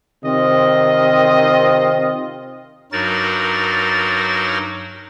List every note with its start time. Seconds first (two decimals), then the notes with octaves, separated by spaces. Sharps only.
0.24 C3 D#3 C4 F4 D#5
2.92 G2 F#3 D#4 F#4 A#4 A6